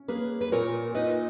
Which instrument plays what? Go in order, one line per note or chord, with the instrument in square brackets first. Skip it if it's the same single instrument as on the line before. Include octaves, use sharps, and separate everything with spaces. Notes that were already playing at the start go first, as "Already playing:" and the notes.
Already playing: [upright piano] C#4
[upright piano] A#3 [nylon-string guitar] G#4 B4
[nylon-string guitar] B4
[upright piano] A#2 [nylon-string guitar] A#4 C#5
[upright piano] D#4 [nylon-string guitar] B4 D#5